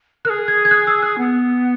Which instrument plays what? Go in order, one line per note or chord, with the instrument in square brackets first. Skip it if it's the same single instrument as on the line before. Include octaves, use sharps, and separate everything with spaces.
[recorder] A#4 [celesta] F#6
[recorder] G#4
[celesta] G#6
G#6
F#6
E6
F#6
[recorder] B3